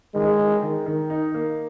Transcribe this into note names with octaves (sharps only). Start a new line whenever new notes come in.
D#3 G#3
D#3
D#3
D#3
D#4
A#3